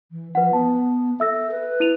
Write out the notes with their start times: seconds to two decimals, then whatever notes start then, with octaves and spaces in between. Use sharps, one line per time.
0.11 E3
0.35 F3 B4 F#5
0.53 B3 A5
1.20 A4 E5 E6 A#6
1.51 B4
1.80 E4 D#7 F7